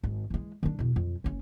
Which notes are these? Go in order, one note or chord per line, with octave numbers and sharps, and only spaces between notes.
G#1
E3 G#3
D#3 D4
E2 B2
F2
F#1 C#4